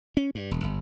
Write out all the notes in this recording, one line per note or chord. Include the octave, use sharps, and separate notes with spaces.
C#4
G2
E1
G1